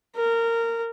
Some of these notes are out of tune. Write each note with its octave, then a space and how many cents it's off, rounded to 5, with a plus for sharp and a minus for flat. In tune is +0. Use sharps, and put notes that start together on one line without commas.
A#4 -20